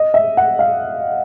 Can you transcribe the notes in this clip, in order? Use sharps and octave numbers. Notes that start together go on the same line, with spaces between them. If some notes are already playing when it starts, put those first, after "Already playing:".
Already playing: D#5
E5
F#5
F5